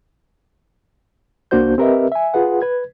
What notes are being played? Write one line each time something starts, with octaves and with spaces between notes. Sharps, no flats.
C2 A#3 D4 F#4 C5 G6
C4 G4 A#4 B4 D#5 E5
E5 G#5
F4 G#4 B4 F#5
B4 G#6